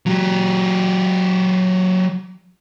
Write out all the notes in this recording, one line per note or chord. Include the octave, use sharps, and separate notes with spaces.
F#3 G4